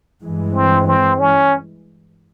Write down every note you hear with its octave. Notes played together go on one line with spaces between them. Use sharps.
G2 E3 G#3
C4
C4
C#4